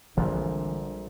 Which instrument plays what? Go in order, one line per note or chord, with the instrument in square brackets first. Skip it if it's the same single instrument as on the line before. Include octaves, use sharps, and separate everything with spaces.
[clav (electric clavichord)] A#1 A#2 [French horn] D3 [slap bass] E3 G#3 C4 [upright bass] G3